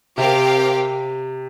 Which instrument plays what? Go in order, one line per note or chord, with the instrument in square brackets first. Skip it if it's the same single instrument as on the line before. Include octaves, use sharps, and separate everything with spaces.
[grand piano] C3 [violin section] C4 G4 A#4 F5